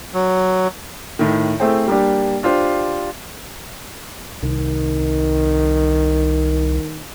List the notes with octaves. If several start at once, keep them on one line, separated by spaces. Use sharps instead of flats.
F#3
A2 D#3
A3 C4 E4 G#4 C5 G5
G3 A#3 D4 G4
D4 F4 G4 C5
C2 D#3